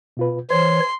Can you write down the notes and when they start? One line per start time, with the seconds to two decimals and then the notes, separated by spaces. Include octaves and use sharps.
0.17 B2 F4 B4
0.51 E3 C5 C#5 C6